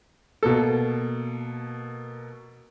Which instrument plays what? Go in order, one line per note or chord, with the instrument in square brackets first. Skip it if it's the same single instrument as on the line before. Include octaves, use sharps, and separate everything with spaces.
[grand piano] B2 A#3 A4